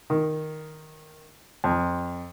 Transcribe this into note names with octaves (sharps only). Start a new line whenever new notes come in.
D#3
F2